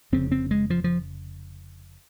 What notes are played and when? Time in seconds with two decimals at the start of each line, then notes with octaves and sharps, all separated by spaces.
0.12 F1 F2 C#3 C4
0.32 C4
0.51 G#3
0.70 F3
0.84 F3